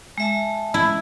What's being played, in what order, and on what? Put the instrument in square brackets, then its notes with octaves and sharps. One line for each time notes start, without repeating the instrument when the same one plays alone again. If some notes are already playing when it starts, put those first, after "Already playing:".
[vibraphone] G#3 E5 A5
[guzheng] E4